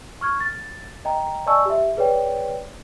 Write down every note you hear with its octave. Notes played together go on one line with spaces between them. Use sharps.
C#6 F6 G#6
A6
D#5 G5 A#5
D5 D#5 G#5 A5 C#6 E6
G4 E5
G#4 B4 C#5 D5 G5